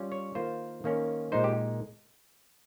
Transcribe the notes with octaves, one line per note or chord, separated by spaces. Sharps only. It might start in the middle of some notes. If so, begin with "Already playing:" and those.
Already playing: G3 C#4 F4
C#5
D#3 A#3 F4 C5
D#3 A#3 C#4
A#2 G#3 D#4 C5
G4